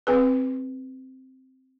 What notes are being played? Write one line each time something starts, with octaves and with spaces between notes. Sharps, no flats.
C4 G#4 B4